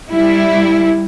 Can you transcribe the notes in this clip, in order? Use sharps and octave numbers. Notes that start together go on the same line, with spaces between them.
G3 E4